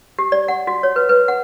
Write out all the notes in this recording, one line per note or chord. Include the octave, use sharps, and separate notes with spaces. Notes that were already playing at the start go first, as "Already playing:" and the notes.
G4
D5
F#5
F#4
C#5
B4
B4
F#5